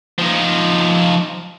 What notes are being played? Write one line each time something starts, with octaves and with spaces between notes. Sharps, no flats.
F3 D#4